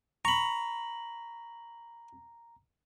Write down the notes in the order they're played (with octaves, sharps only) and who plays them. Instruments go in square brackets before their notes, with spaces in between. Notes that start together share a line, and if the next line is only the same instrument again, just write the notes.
[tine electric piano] A#5 [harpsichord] B5 C#6